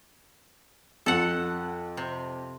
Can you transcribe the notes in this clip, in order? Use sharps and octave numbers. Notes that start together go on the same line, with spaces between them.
F2 A4 F#5
C3